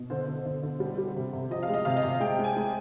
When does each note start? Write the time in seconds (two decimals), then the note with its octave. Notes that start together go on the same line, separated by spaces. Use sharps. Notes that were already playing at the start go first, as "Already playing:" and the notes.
Already playing: B2
0.10 D3 C5
0.27 D3
0.46 D3
0.63 D3
0.80 G3
0.98 G3
1.15 C3
1.33 C3
1.50 F3 D#5
1.63 F5
1.68 G#3
1.74 D#5
1.85 C3 F5
1.97 D#5
2.03 C3
2.20 G#3 G5
2.38 G#3
2.44 G#5
2.56 G#3